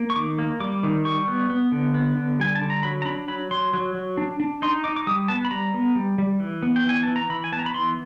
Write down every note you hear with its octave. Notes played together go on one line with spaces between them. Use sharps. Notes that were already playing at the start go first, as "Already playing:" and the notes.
Already playing: A#3
C#6
D#3 D6
A#3
G3 D6
D#3
G3 C#6
B3
B3
D3
B3
D3
G3 G#5
A5
D3
A#5
F#3 B5
A#5
D4 B5
F#3 B5
F#3 C6
F#3
F#3
D4
D4
D#4 C6
D#4 D6
D6
G3 D#6
B3 A5
B5
G3 A#5
B3
G3
G3
E3
B3
G5
E3 G#5
E3 A5
A#5
E3 B5
G#5
B3 A5
A#5
B5
E3 C6